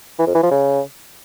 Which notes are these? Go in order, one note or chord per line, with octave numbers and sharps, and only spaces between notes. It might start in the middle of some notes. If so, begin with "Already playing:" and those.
E3
F2
E3
F3
C#3